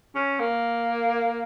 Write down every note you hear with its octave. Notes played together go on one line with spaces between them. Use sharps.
C#4
A#3